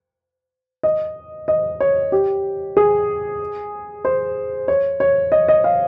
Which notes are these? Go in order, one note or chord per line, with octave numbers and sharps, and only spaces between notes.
D#5
D#5
C#5
G4
G#4
C5
C#5
C#5
D#5
D#5
F5